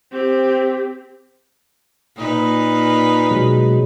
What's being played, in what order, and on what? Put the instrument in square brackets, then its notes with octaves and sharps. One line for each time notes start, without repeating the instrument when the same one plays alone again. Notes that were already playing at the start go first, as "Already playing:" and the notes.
[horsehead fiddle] C4 G4
[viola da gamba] A#2 D#4 B4
[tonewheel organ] B2 F#3 G#3